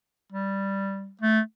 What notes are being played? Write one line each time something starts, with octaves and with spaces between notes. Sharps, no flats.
G3
A3